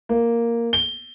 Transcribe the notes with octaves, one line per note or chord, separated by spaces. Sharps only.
A#3
G7